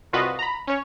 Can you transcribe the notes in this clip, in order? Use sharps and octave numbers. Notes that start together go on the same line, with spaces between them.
C2 F4 F#4 B4 D#5
A#5 B5
C#4 C#5